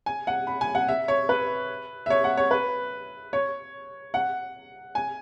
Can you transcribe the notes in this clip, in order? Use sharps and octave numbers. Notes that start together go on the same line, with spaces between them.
G#5
F#5
B5
G#5
F#5
E5
C#5
B4
E5
C#5
F#5
C#5
B4
C#5
F#5
G#5